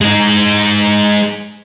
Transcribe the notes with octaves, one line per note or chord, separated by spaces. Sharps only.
G#3 D#4